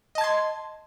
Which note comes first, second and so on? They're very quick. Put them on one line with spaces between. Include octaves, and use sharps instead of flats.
D#5 A5 G#6 C6